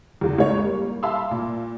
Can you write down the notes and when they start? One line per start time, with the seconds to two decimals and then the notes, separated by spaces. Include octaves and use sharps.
0.21 E2 C#3
0.38 C#2 G#2 C#5
0.65 G3 A#3
1.03 E5 F5 A5 B5 C6 E6
1.31 A#2